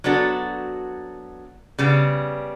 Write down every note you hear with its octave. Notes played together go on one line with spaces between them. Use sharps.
F#3 B3 D4 F#4 A4
C#3 G3 B3